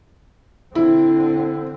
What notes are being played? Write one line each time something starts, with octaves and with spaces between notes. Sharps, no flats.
D3 C4 E4